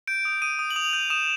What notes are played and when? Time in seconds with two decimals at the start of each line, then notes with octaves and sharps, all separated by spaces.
0.07 G6 D7
0.25 D#6
0.42 D#6 D#7
0.59 D#6
0.70 F#7
0.76 D#6 F7
0.93 G6
1.10 D#6 E7